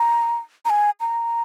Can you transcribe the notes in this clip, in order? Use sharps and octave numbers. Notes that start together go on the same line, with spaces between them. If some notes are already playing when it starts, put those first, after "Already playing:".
Already playing: A#5
A#5
G#5
A#5